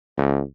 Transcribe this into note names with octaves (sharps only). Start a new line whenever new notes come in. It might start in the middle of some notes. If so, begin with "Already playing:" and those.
C#2